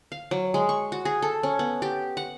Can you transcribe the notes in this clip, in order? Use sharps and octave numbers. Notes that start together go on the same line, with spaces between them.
F5
F#3
G#3
C#6
F#4
G#4
A4
C#4
B3
G4
F#5